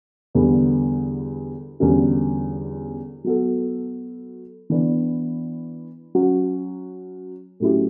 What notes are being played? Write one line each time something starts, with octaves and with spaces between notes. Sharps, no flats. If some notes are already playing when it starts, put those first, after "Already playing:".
E2 D3 G3 B3
E2 D3 G3 C#4 F#4
F#3 B3 F#4 A4
E3 B3 D4
F#3 C#4 F#4
A2 F#3 C#4 E4 G4